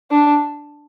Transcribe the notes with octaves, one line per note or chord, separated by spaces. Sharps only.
D4